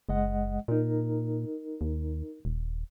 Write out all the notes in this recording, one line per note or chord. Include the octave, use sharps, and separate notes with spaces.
F#1 G#3 D#5 F#5
A#2 D#4 A#4
D#2
D#1